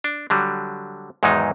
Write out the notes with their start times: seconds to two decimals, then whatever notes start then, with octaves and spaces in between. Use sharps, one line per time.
0.04 D4
0.30 D3 F#3 G3
1.23 E2 G#2 D#3 F#3 G#3 D#4